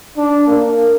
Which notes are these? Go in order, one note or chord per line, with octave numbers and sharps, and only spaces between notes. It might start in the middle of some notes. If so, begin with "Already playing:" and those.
D4
A#3